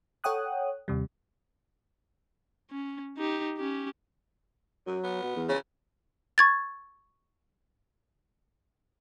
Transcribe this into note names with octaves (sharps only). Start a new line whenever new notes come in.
A4 C#5 F#5 G5 D#6 F#6
D#2 C3 G3
C#4
D#4 G4
C#4 G4
F#2 F#3
B3
B2
E2
C#3
C#6 G#6 A6